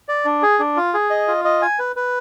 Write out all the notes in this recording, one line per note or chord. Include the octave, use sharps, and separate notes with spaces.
D5
D4
G#4
D4
F4
G#4
D#5
F4
D#5
G#5
B4
B4